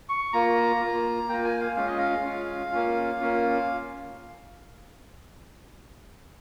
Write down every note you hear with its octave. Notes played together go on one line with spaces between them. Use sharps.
C#6
A#3 F4 A#5
A#3 F4
A#3 F4 G5
G#5
F5
G#3 C#4 F4 F5
D#5
F5
G#3 C#4 F4
A#3 C#4 F4
A#3 C#4 F4